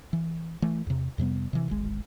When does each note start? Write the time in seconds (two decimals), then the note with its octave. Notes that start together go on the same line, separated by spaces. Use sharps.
0.13 E3
0.62 E3 A3
0.87 E2 C3
1.18 F2 C3 G3 B3
1.53 C3 E3
1.68 D1 G#1 G#3